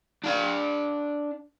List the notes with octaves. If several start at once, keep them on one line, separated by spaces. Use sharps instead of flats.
D4 F5